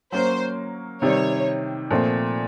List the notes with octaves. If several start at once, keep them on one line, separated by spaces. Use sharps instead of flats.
F#3 A#3 C#4 C5
C3 D#3 G3 C#5
A#2 F3 A3 C4